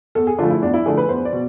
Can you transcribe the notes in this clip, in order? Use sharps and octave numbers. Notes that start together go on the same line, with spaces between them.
E2 A4
G#4
D3 F3 A3 F4
E4
E2 D4
E4
D3 F3 A3 G#4
B4
E2 C5
D5
B2